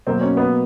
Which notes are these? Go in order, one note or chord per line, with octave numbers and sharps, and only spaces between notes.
B2 F#3 A#3 C4
C#4
B3